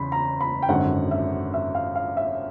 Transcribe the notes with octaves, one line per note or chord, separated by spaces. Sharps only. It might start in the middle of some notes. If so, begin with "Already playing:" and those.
Already playing: E2 C#3 B5 C6
A#5
B5
G5
G#1 F#2 D3 F#5
E5
E5
F5
F5
E5